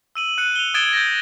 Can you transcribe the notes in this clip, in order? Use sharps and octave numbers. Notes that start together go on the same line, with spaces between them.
E6 D#7 F#7
F#6 C#7 D#7
F7 G7
D#6 G#6 A6 D7 E7 G7
G6 A6 A#6